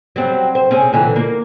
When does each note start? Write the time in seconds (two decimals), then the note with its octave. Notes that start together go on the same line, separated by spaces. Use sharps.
0.16 F#3 G3 C4
0.55 C5
0.71 C4 C#4 G#4
0.93 A#2 D3 E3
1.16 A#3